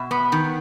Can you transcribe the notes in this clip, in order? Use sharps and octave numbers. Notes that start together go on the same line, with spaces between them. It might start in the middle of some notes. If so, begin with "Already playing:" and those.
Already playing: B2 E5
B3
D#3